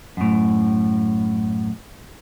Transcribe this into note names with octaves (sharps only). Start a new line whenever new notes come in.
F#2 A2